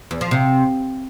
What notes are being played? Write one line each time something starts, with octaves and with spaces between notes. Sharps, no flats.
E2
F3
C3